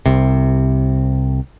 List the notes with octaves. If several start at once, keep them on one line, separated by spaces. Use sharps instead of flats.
C2 C3